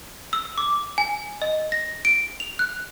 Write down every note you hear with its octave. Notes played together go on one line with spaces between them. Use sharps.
E6
D6
G#5
D#5
A#6
D7
F7
F#6